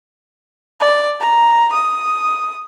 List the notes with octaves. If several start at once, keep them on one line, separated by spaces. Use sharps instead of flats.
D5
A#5
D#6